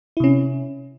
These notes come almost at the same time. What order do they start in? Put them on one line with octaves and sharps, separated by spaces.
E4 C3 C#4